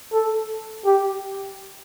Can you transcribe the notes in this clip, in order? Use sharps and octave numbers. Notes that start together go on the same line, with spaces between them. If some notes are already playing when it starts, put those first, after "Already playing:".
A4
G4